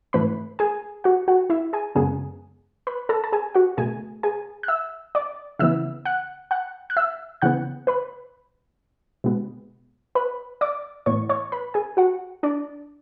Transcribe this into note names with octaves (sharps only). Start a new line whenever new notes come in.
G#2 E3 A3 B4 B5
G#4 G#5
F#4 F#5
F#4 F#5
E4 E5
G#4 G#5
F#2 C#3 G#3 B3 G#4 G#5
B4 B5
A4 A5
A5
G#4 G#5
F#4 F#5
B2 A3 G#4 G#5
G#4 G#5
F#6
E5 E6
D5 D6
C#3 E3 B3 E5 E6
F#5 F#6
F#5 F#6
F#6
E5 E6
C#3 E3 B3 F#5 F#6
B4 B5
B2 G#3 B3
B4 B5
D5 D6
A2 E3 B3 C#5 C#6
C#5 C#6
B4 B5
G#4 G#5
F#4 F#5
D4 D5